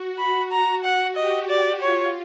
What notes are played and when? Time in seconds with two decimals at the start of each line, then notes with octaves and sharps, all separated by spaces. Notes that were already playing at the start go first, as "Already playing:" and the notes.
Already playing: F#4
0.19 B5
0.51 F#4 A#5
0.84 F#5
1.16 G4 D#5
1.49 F#4 D5
1.81 F4 C#5